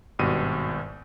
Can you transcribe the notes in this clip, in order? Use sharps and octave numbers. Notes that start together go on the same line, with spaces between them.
G#1 G2 B2 D#7